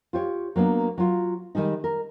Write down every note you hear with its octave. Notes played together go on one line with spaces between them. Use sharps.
F4 G4 C#5
F#3 A#3 B3 D4
F#3 F4
D#3 G3 G#3 D#4
A#4